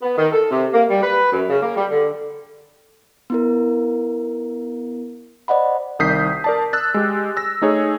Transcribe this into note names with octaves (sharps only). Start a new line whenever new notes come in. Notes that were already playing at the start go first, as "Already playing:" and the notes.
B3
D#3
A4
C3
A#3
G3
B4
F#2
C#3
A#3
G3
D3
B3 E4 A#4
C5 D5 D#5 F#5 B5
C2 D#3 D#6 G6 B6 C7
A#4 D5 A5
E6 F#6 A6
G#3 G4
E6 A#6
A3 D#4 G#4 C#5